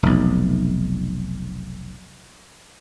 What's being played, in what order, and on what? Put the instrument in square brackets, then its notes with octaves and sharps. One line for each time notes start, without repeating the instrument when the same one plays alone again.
[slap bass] F1 B1